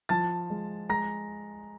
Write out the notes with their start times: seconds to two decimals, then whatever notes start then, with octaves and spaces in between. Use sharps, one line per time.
0.09 F3 A5 A6
0.50 G#3
0.89 G#3 A#5 A#6